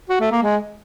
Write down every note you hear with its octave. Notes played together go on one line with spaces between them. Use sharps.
F#4
A3
A#3
G#3